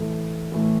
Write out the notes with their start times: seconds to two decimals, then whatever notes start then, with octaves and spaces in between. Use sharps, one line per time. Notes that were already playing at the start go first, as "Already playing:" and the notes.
Already playing: A2 E3 A3 E4 A4
0.52 A2 E3 A3 E4 A4